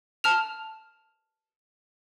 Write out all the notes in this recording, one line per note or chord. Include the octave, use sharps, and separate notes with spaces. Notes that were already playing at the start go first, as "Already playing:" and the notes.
A5 F6 F7